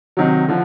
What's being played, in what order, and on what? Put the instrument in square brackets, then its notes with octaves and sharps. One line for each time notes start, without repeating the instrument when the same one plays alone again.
[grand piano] C3 D#3 F#3
D3 F3